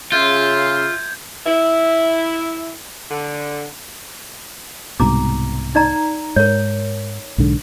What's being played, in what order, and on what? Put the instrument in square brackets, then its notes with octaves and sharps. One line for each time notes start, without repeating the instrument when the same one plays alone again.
[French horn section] C#3 [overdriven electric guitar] F4 [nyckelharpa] E5 C6 [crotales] G6 G#6
[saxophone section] E4
D3
[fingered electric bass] C2 G#2 B2 [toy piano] A#5 D6
[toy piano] D#4 D5 A#5
[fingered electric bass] G#2 [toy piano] A#4 C#5
[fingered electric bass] B1 G#2 D3